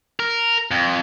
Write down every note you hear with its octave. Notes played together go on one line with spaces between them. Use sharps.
A#4
F2